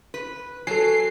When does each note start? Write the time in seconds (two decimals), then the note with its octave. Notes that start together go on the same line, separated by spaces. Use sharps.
0.14 B4
0.67 F#3 A4 G#5 C7